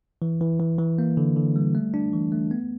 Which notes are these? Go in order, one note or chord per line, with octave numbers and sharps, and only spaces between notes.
E3
E3
E3
E3
A#3
D3
D3
G3
A3
D4
E3
A3
B3